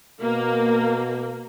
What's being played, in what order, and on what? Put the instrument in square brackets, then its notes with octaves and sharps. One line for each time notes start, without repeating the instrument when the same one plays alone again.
[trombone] B2 [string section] A#3